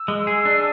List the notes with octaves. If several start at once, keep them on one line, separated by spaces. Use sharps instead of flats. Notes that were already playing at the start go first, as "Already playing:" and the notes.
Already playing: E6
G#3
G#4
D4